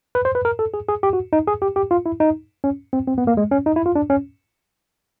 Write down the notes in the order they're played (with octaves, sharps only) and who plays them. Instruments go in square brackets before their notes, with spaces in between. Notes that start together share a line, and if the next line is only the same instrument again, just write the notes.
[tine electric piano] B4
C5
B4
A#4
A4
G#4
G#4
G4
F#4
D#4
G#4
G4
G4
F4
E4
D#4
C#4
C4
C4
B3
A#3
G#3
C#4
D#4
E4
F4
D4
C#4